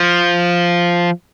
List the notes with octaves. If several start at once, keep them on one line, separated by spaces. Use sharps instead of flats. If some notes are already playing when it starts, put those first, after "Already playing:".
Already playing: F3